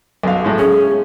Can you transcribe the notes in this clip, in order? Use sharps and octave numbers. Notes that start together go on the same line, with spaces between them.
B1 F#2 F5
A2 G#3
C#4 G#4